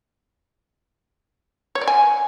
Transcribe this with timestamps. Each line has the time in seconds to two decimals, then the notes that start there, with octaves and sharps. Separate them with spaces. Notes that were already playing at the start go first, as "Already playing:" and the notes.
1.75 C#5
1.81 D5
1.88 G#5